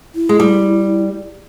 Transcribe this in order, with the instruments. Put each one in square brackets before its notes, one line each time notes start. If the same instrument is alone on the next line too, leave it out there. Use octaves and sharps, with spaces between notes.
[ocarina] E4
[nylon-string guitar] G#3
G3